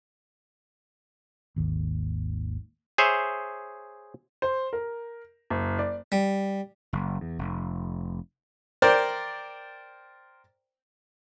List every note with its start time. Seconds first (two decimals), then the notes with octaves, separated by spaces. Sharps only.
1.56 G#1 D#2
2.98 G#4 C5 C#5 E5
4.42 C5
4.73 A#4
5.50 F#1
5.79 D5
6.12 G3
6.93 F#1
7.21 E2
7.38 F1
8.82 A#4 C5 D5 G5